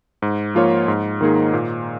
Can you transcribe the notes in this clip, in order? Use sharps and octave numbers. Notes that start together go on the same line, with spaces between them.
G#2
F3 A#3 F4 C#5
G#2
D#3 A#3 D#4 G#4
A#2